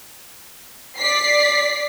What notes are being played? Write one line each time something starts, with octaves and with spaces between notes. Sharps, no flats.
D5 B6 C7